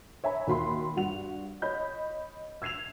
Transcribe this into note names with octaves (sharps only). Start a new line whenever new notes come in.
C#5 E5 G#5 A#5 B5
D#2 F#4 B5 C6
G2 F#4 F#5 F7
C#5 D#5 B5 G6
E6 G#6 C7 E7 F7